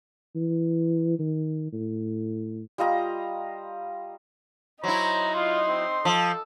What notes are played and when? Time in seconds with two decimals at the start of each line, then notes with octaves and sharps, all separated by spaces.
0.35 E3
1.18 D#3
1.72 A2
2.78 G3 F4 D#5 A#5
4.84 F#3 D#4 E4 C5 A#5
5.35 F4 C6
5.68 C4
6.05 F3 A4